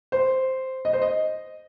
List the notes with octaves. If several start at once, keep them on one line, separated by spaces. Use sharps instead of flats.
C5
D#5
C5
D#5